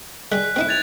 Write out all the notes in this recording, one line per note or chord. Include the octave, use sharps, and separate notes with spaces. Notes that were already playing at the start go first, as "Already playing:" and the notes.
G3 G#3 F#6 B6
C4 D#4 E4
G#6 A6 F7